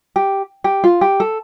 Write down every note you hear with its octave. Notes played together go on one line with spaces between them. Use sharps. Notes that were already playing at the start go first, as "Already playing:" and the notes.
G4
G4
F4
G4
A4